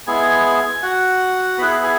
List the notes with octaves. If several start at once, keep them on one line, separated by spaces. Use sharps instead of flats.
G#3 B3 E4 G#4 G#5
F#4 F#5
B3 E4 G#4 B4 B5
G#4 G#5